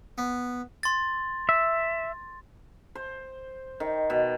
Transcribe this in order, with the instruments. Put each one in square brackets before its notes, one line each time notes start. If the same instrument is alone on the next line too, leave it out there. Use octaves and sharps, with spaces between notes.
[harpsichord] B3
[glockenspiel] C6 A6
[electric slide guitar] E5
[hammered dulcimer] C5
D#3
B2